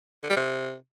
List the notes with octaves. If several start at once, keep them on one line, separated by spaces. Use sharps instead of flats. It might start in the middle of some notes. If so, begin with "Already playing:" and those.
D3
G3
C3